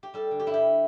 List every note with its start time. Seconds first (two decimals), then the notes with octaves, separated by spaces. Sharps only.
0.03 G4
0.14 G3 A4
0.31 D3
0.40 G4
0.47 G2 E4
0.54 G4